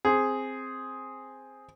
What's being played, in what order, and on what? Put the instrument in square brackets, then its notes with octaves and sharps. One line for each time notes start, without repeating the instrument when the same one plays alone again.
[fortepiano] C4 G#4